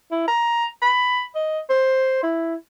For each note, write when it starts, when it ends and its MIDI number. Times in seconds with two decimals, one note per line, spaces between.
0.11 0.27 64
0.28 0.65 82
0.82 1.25 83
1.35 1.59 75
1.70 2.22 72
2.23 2.55 64